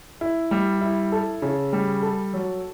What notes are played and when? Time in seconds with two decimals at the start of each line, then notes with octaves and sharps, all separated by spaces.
0.21 E4
0.51 G3
0.81 E4
1.12 A4
1.42 C#3
1.73 G3
2.02 A4
2.33 F#3